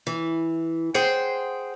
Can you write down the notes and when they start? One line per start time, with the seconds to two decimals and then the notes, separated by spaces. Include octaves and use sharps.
0.07 E3
0.94 G#4 C5 F#5 G5